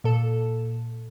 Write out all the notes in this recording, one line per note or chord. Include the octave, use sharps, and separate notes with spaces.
A#2 A4